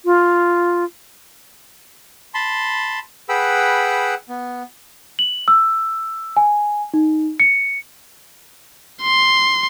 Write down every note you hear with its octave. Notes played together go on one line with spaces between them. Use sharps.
F4
A5 B5 C6
G#4 B4 F#5 G5 B5 E6
B3
F#7
E6
G#5
D#4
C#7
C6